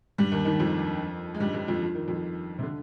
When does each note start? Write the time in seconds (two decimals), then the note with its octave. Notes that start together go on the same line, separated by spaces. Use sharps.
0.18 G2 G3
0.32 D#2 D#3
0.45 D#2 D#3
0.59 F2 F3
1.34 G#3
1.40 G2 G3
1.54 G2 G3
1.67 F2 F3
1.81 F3
1.95 D#3
2.08 F2 F3
2.59 C3
2.62 D3